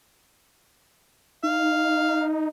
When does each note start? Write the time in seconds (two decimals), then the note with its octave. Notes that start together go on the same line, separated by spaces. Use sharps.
1.43 D#4 F5